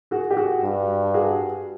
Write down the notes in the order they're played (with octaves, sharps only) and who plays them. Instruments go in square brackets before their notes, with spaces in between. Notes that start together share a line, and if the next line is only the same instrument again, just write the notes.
[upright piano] F#4 G#4
G4
F#4 G#4
[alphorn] G2
[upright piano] F#4 G#4